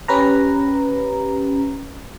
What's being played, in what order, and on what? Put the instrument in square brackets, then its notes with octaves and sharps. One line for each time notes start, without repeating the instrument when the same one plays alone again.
[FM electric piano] C#4 G4 B4 A#5